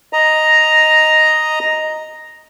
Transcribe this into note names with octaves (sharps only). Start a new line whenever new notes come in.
D#5 A#5